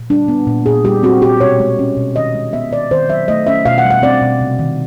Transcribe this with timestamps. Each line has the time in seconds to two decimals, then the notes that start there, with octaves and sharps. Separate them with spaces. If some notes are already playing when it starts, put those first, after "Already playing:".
Already playing: A#2
0.10 G3 D4
0.28 B3
0.47 A#2
0.66 A#2 G#4
0.85 G3 G4
1.03 C4 F#4
1.22 A#2 G4
1.40 B2 C#5
1.60 G#3
1.79 C#4
1.97 B2
2.16 D#3 D#5
2.34 G#3
2.53 B3 E5
2.71 D#3 D5
2.91 D#3 C5
3.09 F#3 E5
3.28 A3 D#5
3.47 C#4 E5
3.65 B2 F5
3.78 F#5
3.85 G3
3.91 F#5
4.02 C4 D5
4.22 B2
4.41 C3
4.59 D#3